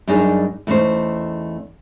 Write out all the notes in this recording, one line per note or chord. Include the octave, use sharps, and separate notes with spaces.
F#2 G3 D4 D#4 G#4
E2 A3 C#4 D#4 C5